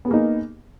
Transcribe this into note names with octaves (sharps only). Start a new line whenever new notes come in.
A#3 B3 D#4 G#4